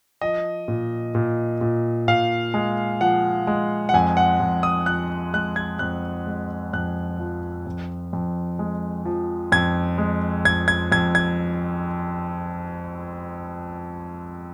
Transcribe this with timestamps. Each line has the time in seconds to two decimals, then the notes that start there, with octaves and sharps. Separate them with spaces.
0.21 F3 D#5
0.68 A#2
1.15 A#2
1.61 A#2
2.08 A#2 F5
2.54 G#3
3.01 F3 F#5
3.47 G#3
3.89 F#5
3.94 F2 G#5
4.17 F#5
4.40 F2
4.63 D#6
4.86 F3 F#6
5.33 G#3 F#6
5.56 G#6
5.79 F2 F#6
6.27 G#3
6.73 F2 F#6
7.20 F3
7.67 F2
8.13 F2
8.59 G#3
9.05 F3
9.52 F2 G#6
9.98 G#3
10.45 F2 G#6
10.68 G#6
10.92 F2 G#6
11.15 G#6